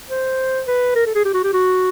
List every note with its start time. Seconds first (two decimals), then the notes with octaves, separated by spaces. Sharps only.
0.10 C5
0.67 B4
0.95 A#4
1.06 A4
1.15 G#4
1.25 G4
1.34 F#4
1.44 G4
1.53 F#4